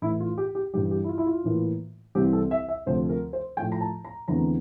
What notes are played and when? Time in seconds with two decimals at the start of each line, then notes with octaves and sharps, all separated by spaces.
0.02 A2 E3 A3 E4
0.20 F4
0.38 G4
0.55 G4
0.73 G2 E3 G3 G4
0.91 G4
1.04 E4
1.09 F4
1.18 E4
1.27 F4
1.44 A2 E3 A#3
2.15 C2 C3 E3 G3 C4 G4
2.33 A4
2.51 E5
2.69 E5
2.86 D2 C3 F3 A3 C5
3.09 A#4
3.33 C5
3.57 A2 F3 A3 G5
3.72 A#5
3.81 A5
4.05 A#5
4.28 E2 D3 A3 C4 A#5